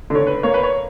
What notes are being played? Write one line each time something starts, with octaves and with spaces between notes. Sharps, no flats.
D3 C#5
B4
A#3 C#5
B4
C#5